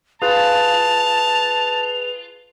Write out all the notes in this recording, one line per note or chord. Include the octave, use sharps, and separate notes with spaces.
F4 G#4 B4 A5 F7